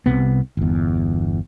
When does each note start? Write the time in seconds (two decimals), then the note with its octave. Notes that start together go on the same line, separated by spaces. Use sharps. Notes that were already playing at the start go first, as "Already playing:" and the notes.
0.06 C2 G2 C3 B3
0.57 G1 E2